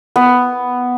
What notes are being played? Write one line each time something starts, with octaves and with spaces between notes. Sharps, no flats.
B3